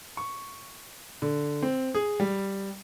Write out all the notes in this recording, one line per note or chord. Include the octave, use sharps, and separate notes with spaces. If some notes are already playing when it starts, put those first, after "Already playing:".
C#6
D3
C4
G#4
G3